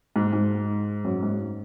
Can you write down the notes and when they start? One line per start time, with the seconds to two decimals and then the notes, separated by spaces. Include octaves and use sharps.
0.16 G#2
0.33 G#2
1.04 F#2
1.23 G#2